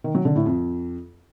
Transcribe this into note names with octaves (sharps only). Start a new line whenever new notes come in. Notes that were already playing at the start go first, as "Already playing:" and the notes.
D#3
F#3
D3
A2
F2